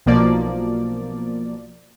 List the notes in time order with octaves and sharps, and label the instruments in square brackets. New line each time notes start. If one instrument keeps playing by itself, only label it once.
[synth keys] B1 B2 F3 A#3 D5